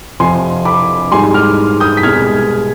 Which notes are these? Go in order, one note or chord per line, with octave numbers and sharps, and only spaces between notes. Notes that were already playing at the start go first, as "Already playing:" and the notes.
F2 C3 F3 G#5 C6
B5 D6
G#2 G3 G#5 C6
D6 F6
D#6 G6
B6
C2 B2 G#3 F6 G#6